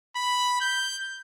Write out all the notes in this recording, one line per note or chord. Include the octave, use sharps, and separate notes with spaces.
B5
G6